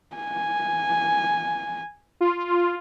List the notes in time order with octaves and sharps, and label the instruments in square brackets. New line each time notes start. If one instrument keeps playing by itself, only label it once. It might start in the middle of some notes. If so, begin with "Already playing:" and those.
[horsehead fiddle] G#5
[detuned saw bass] F4